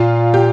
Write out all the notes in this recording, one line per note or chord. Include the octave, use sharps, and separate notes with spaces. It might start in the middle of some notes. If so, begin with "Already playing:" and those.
Already playing: A#2 F4
G4